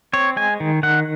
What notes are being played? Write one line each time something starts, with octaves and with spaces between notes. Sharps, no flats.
C4 C#5
G#3 G#5
D#3
D#3 F#5